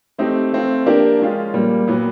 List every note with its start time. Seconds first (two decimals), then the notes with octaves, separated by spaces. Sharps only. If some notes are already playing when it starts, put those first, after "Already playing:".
0.18 A3 C4 D#4 G4
0.53 A3 C4 F4
0.86 F3 A#3 D4 G4 A#4
1.20 F3 G#3 C#4 F4
1.54 A#2 G3 A#3
1.88 A#2 F#3 B3